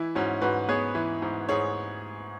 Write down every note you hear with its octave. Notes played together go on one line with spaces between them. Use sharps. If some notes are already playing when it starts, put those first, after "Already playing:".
Already playing: E3 E4
G#2 C#4 F#4
G#2 F#4 B4
B3 G#4 C#5
E3
G#2
G#2 G#4 C#5